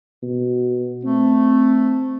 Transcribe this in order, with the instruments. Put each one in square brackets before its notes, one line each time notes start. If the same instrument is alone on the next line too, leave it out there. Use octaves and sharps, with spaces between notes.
[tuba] B2
[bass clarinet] A3 [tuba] C4